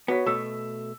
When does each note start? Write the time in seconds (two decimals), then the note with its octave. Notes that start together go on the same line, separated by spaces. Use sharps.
0.08 B3 F#4 C#5 B6
0.27 B2 A3 E6